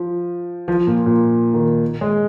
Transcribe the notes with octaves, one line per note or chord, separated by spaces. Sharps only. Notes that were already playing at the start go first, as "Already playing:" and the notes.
Already playing: F3
F3
A#2
A#2
D#3
G#3